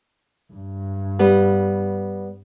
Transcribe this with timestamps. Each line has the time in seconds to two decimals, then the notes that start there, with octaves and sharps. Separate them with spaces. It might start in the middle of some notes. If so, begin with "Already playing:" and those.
0.53 G2
1.19 G3 B3